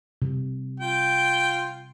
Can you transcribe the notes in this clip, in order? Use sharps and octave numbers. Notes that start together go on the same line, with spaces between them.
C3
F4 G5